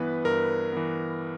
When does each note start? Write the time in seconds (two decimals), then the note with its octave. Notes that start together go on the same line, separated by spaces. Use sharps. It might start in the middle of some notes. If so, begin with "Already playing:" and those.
Already playing: G2 E3 B3 B4
0.25 G2 A#4
0.72 E3 B3